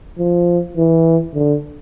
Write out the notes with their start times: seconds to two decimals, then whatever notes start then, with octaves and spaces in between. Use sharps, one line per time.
0.19 F3
0.77 E3
1.35 D3